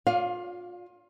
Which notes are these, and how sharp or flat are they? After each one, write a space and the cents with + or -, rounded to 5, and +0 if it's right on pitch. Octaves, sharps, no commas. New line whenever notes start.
F4 +30 D5 -20 F5 +0